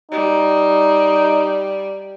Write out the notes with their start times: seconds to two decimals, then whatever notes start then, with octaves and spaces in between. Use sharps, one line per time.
0.11 G3 D#4